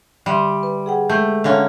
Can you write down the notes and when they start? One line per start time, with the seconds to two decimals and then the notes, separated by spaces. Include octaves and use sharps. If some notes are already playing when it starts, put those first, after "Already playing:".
0.26 D3 G3 E5 C6
0.63 B4
0.86 G#4 F#5 G5
1.10 G#3 A3 G6
1.44 D3 A#3 C#4 E5